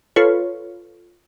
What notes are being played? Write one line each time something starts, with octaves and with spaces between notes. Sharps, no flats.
F4 A4 B4 C#5